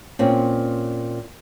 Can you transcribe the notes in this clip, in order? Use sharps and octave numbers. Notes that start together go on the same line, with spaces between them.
A#2 C4 C#4